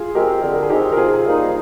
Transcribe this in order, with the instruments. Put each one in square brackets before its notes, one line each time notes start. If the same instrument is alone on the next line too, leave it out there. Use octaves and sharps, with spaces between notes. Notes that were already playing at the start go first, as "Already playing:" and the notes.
Already playing: [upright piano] F4 G#4
[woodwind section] G#3 C4 [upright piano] G4 A#4
[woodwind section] D3
[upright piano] A#4
G#4
[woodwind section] G#3 C4 [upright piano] D#4 G4
[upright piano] A#4
[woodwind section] C3 [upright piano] F4 G#4
[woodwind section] G3 A#3 D#4